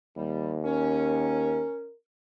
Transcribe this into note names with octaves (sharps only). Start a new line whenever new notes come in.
D#2 G3
C#4 A#4